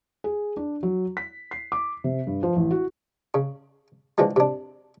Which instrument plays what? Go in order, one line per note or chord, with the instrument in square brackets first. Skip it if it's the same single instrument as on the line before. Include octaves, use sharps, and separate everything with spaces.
[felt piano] G#4
D4
F#3
B6
C7
D6
C3
G2
F3
A1
F#4
[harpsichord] C#3
D3 E3 F3 G#3 A3
C3 D4